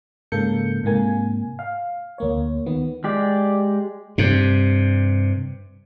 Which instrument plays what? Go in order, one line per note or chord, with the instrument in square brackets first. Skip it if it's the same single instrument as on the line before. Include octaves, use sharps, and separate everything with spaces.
[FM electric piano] G#2 C#3 A#3 A4 G6 C#7
G#2 C3 A#3 G#5
F5
D2 A#3 C#5
D#3 B3
[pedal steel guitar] G#3 G4 D5
[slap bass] G2 C3